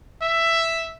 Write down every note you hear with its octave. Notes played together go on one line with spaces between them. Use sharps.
E5